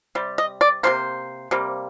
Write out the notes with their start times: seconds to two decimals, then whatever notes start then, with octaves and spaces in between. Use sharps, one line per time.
0.15 C3 G3
0.38 D#5
0.61 D5
0.83 C3 G3 A#3 C5
1.51 C3 G3 A#3